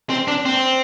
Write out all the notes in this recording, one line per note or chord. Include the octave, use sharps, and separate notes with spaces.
C4
D4
C4